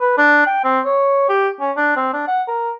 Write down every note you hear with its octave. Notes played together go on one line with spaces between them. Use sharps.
B4
D4
G5
C4
C#5
G4
C#4
D4
C4
D4
F#5
A#4